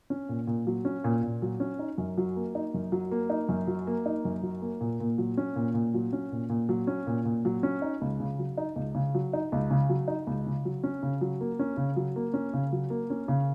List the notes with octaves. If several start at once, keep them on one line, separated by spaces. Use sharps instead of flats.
C#4
A#2
A#2
F#3
C#4
A#2
A#2
F#3
C#4
D#4
F#2
F#3
A#3
D#4
F#2
F#3
A#3
D#4
F#2
F#3
A#3
D#4
F#2
F#3
A#3
A#2
A#2
F#3
C#4
A#2
A#2
F#3
C#4
A#2
A#2
F#3
C#4
A#2
A#2
F#3
C#4
D#4
C#2
C#3
F#3
D#4
C#2
C#3
F#3
D#4
C#2
C#3
F#3
D#4
C#2
C#3
F#3
C#4
C#3
F#3
A#3
C#4
C#3
F#3
A#3
C#4
C#3
F#3
A#3
C#4
C#3